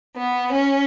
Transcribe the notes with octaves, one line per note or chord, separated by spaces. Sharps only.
B3
C#4